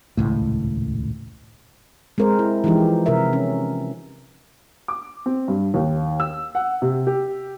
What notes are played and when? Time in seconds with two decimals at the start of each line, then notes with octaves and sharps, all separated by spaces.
0.17 D#1 G#1 C#2 A2
2.18 G#3 C4 A#4 C5
2.39 E4
2.64 E3 F3 G#3 D#4 G4
3.06 C3 A#4 E5
3.33 C#4
4.88 D6
5.26 C4
5.48 G2
5.74 D#2
6.20 E6
6.55 F#5
6.82 C3
7.07 G4